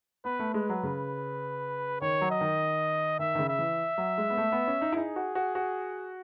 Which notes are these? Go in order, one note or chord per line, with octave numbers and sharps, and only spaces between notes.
B3 B4
A3
G#3 B4
F#3
C#3
D#3 C#5
F#3
D#5
D#3
D#3 E5
D#3
C#3
E5
E3
F#3
G#3
B3
A3
B3
C#4
D#4
E4
D#4 G#4
F#4
F#4
F#4